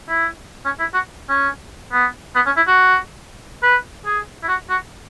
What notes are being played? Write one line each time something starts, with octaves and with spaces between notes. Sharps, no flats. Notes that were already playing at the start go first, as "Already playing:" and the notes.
E4
C#4
E4
F#4
C#4
B3
B3
C#4
E4
F#4
B4
G#4
E4
F#4
F#4